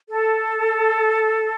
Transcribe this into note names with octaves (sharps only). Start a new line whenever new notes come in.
A4